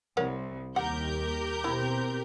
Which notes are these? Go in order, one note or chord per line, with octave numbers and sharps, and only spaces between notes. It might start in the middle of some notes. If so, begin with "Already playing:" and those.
C2 A#4 C#5 F#5
D#2 G4 A#4 F#5 G6
B2 C4 E4